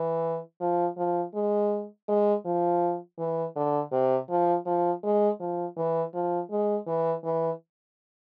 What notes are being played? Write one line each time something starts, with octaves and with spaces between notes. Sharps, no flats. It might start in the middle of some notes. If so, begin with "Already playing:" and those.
Already playing: E3
F3
F3
G#3
G#3
F3
E3
D3
C3
F3
F3
G#3
F3
E3
F3
G#3
E3
E3